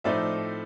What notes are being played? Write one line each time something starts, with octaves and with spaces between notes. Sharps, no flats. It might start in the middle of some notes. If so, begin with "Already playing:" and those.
A2 F3 A3 C4 D#4 D5 E5